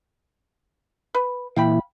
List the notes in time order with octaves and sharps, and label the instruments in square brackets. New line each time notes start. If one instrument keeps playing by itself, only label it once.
[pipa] B4
[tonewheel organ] A#2 E3 E4 [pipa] F5 G5 B5